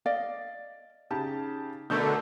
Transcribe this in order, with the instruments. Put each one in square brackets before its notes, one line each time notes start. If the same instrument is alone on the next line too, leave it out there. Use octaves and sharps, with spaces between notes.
[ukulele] D5 D#5 F5
[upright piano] C#3 G4 A5 [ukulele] D#4
[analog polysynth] B2 D3 A3 [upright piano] A#4 E6 G6